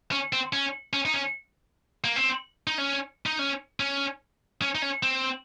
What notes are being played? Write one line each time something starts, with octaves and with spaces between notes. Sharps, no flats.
C#4
C4
C#4
C#4
D#4
C#4
A#3
C4
D#4
C#4
D#4
C#4
C#4
C#4
D#4
C#4
C4